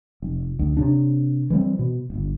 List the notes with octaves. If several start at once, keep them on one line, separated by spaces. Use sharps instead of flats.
F1
D2
C3 D4
E3 G3 G#3 C4
B2
D1 G1